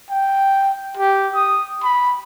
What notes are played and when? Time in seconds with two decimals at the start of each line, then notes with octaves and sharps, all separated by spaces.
0.10 G5
0.97 G4
1.35 D#6
1.83 B5